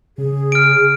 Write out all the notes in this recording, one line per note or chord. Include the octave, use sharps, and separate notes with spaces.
C#3 G#4
F6 D7